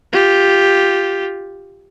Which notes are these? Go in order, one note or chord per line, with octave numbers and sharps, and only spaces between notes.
F4 G4